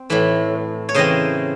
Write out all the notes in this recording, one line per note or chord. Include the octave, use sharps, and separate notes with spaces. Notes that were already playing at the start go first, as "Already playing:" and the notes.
Already playing: C4
A2 E3 A3
C#5
C#3 E3 C4 C5 D#5